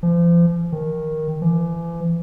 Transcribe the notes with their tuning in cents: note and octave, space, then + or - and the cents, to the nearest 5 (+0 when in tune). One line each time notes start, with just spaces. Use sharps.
F3 -35
D#3 +5
E3 +40